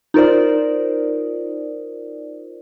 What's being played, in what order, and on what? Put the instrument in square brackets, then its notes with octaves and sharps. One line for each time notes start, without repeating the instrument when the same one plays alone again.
[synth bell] D#4 F4 A#4 C5 D5